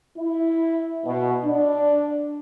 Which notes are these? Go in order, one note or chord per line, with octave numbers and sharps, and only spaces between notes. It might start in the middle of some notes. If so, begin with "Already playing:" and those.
E4
B2
D4